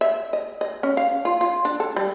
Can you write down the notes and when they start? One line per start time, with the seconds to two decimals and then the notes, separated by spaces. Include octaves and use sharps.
0.01 E5
0.33 D#5
0.61 D#5
0.83 C#4
0.97 F5
1.25 F4
1.41 F4
1.65 D4
1.80 A4
1.96 G3